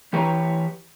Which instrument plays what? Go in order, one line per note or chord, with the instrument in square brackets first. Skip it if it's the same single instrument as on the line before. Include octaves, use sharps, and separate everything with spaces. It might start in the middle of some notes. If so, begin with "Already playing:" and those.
[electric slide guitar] E3 G4 B4 C#5 A#5